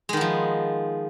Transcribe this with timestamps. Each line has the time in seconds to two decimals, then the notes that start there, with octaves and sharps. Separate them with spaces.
0.09 G#3
0.13 D#3
0.17 B3
0.21 F3